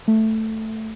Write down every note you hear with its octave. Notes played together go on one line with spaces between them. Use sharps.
A3